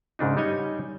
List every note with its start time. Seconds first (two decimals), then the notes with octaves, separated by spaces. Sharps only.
0.19 G#2 C#3 D4 D#4
0.37 G3 D#4 C#5 D#5 G#5